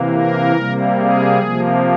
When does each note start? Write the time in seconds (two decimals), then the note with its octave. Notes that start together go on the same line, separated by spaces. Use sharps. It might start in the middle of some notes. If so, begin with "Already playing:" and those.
Already playing: C3 E3 A#3
0.13 A#4
0.56 C3 G3 A#3
1.00 G#4
1.43 C3 F3 A#3